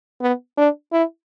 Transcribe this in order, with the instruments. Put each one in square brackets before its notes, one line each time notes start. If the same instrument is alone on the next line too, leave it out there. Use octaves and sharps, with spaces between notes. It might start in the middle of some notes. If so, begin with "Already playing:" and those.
[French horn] B3
D4
E4